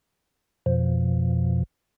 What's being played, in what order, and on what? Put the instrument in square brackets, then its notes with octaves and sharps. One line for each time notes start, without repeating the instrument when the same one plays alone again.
[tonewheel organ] F2 B2 F3